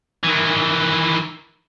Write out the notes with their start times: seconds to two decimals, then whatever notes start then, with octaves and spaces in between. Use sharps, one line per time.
0.24 D#3 E3